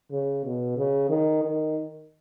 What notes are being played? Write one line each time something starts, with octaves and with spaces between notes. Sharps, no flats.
C#3
B2
C#3
D#3
D#3